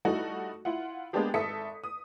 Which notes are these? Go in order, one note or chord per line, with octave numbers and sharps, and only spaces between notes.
G3 A3 D#4 E4 F#4 A4
E4 F4 F#5
G#3 A#3 B3 D4 G4 G#4
G#1 A4 E5 D#6 B6 C#7
D#6